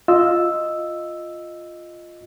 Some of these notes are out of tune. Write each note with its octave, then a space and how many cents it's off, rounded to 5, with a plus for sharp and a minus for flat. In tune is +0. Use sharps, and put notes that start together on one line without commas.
F4 +0 D#5 +0 E6 +0